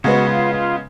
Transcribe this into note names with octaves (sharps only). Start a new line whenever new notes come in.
C#3 G#3 B3 F#4
F4
F4